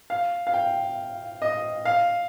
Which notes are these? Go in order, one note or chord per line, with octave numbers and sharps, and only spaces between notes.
F5
F5
G5
D#5
F5